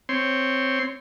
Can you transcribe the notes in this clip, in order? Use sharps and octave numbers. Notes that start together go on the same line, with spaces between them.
C4 C#5 C6